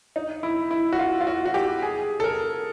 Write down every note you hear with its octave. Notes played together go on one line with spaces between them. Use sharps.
D#4
E4
E4
F#4
F4
F4
F#4
F#4
G4
G#4
A4
A#4